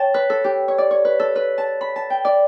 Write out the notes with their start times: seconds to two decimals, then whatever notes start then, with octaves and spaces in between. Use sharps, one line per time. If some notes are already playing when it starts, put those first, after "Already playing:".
Already playing: C#5 G5 A5
0.14 B4
0.30 A4
0.44 G4
0.68 C#5
0.78 D5
0.91 C#5
1.05 B4
1.20 A4
1.35 B4
1.58 A5
1.81 B5
1.96 A5
2.10 G5
2.25 D5